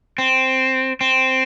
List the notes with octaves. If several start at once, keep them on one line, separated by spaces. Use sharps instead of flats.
C4
C4